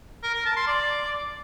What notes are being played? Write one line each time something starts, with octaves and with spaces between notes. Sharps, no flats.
A#4
A#4
A5
C6
D5